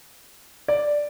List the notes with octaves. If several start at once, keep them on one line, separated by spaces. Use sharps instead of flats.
D5